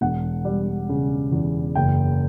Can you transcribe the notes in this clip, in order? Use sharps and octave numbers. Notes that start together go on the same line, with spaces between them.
E1 F#5
G3
C#3
E2
F#1 G5